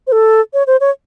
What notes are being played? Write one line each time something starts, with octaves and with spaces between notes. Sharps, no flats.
C5
A4
C#5
C5
C#5